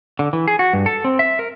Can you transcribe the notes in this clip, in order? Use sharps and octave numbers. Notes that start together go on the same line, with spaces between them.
D3
E3
G#4
F#4
G2
A4
C4
E5
A#4